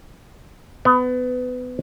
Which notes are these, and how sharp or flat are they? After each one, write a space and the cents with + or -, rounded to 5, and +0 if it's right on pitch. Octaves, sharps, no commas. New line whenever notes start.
B3 +25